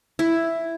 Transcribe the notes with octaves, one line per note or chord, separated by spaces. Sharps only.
E4